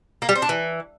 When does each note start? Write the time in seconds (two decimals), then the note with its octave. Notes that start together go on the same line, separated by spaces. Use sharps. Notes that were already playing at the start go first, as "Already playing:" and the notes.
0.22 A#3
0.29 G3
0.35 C4
0.42 D4
0.49 E3